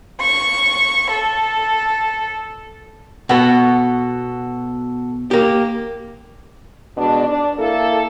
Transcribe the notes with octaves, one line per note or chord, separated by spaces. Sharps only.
C#6
A4
B2 B3 F#4 A4
A#3 G4
B2 G#3 D4
D4
A#3 E4 A4